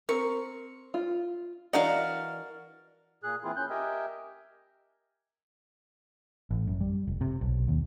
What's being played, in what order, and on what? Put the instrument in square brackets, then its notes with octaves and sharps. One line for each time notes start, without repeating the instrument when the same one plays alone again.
[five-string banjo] C4 A#4 [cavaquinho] C#6
[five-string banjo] F4
[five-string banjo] E3 D4 D#5 [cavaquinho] F#4 A#4 F5
[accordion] A#2 G#4 F#6
E3 A#3 C4 E4 F4 G#4
C#4 F#6 G6
G4 A#4 D#5 E5 G5 G#5
[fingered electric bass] A1
F#2
G3
F1
C3
B1
D#2